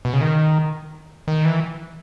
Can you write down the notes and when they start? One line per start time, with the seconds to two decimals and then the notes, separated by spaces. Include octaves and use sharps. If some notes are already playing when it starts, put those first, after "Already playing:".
0.05 B2
0.13 C#3
0.21 D#3
1.28 D#3
1.45 E3